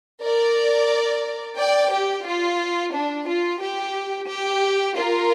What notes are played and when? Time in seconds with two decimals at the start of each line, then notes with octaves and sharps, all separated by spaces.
0.22 A#4 D5
1.58 D5 G5
1.92 G4
2.26 F4
2.94 D4
3.27 F4
3.61 G4
4.29 G4
4.96 F4 A#4